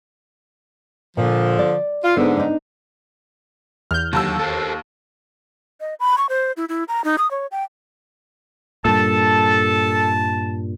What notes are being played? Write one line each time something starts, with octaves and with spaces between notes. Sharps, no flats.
A#2 D3 F3
D5
F4
G#2 D3 B3
D4 D#4
E2 F6 G6
D#2 D3 F#3 A5 E6
A4 A#4 C5
D#5
B5
C#6
C5
E4
E4
A#5
D#4
D#6
C#5
G5
G2 A#2 A4 A5